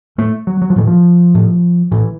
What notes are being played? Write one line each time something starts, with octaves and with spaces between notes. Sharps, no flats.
A2 A3
F#3
F#3
F3
A2 E3
F3
A2
A2 E3